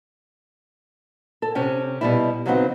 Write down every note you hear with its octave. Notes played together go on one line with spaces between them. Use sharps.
A4
C3 C#4 G5
B2 G3 E4
C#3 F#3 A3 B3 C4 D#4